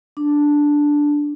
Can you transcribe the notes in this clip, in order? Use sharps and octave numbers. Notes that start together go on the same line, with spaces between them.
D4